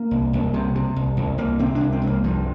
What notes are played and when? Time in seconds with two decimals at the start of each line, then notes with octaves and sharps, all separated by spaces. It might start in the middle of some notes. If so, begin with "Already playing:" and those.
Already playing: A#3
0.11 C2
0.33 C2
0.54 C3
0.75 C3
0.96 C2
1.17 C2
1.38 C2 A#3
1.59 C3 C4
1.75 D4
1.80 C2
1.92 C4
2.01 C2
2.07 A#3
2.24 G2 F3